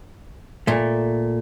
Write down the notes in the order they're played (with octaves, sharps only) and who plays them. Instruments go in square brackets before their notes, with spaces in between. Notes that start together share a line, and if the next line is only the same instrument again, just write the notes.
[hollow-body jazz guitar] A#2 A3